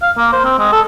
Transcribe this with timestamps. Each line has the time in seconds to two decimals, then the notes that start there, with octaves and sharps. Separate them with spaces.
0.02 F5
0.17 A#3
0.33 C5
0.45 C4
0.59 G#3
0.72 A4